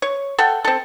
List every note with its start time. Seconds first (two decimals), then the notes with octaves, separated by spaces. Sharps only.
0.02 C#5
0.38 A4 F#5 G5
0.64 C4 A4